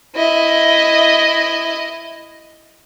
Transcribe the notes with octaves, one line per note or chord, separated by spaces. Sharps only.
E4 D#5